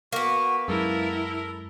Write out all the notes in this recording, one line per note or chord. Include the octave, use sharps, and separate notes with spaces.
A#3 B3 F#4
F#2 G#3 E4 A4 A#4